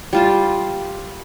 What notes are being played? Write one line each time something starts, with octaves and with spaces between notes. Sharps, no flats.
G3 F4 A5